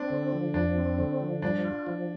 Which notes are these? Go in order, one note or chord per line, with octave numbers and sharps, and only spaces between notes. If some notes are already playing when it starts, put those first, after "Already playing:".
Already playing: C4 D4
D3
F3
F2 D4
C4
D3
F3
G2 D4
F4
F3